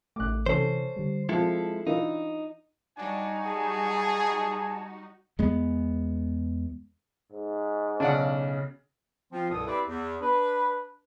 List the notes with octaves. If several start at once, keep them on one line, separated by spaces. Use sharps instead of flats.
A1 A3 D6 F#6
C3 E3 C#4 A4 C5
D3 G3
F3 G#3 C4 E4 A4 A5
E3 D4 D#4 F4
G3 D4 D#4 F#4 G#5
G#4 A5
E2 G#3 B3
G#2
B1 C#3 D4 D5 F#5
F3 C4 F4
C2 G2 B2 A4 D#6
C4 E4 G4 B4 D5
E2
D4 B4